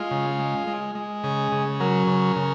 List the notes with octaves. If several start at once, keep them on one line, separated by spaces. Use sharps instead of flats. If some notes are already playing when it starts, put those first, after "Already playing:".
Already playing: G#3 F4
C#3
G#3
G#3
G#3
C#3 G#4
C#3
F#3 A#4
C#3
C#3